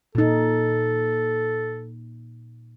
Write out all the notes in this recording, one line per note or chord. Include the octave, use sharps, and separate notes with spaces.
A#2 D#4 A4